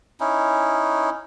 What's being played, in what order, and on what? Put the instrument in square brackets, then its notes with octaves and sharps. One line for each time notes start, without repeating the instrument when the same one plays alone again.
[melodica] C#4 D#4 E4